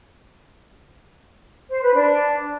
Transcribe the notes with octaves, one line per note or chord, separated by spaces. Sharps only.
C5
B4
D4